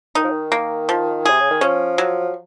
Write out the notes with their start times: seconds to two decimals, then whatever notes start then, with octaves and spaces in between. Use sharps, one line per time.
0.15 D#3 D#4
0.24 F3
0.30 D#3
0.52 A#3
0.89 F3
1.25 C3 G#4
1.40 C#3
1.50 D#3
1.61 F3 C#4
1.98 F#3